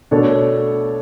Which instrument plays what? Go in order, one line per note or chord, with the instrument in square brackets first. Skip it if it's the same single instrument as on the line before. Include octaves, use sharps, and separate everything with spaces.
[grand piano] B2 A3 D4 A4 C#5